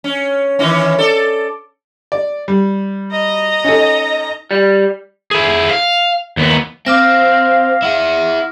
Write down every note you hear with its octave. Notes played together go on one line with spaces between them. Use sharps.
C#4
D#3 E3 C#4
A4 D5
D5
G3
D#5 A#5
C#4 D#4 A4
G3
E4 G#4
F5
D#2 B3
C4 F5 D6 F6 A#6
E4 F#5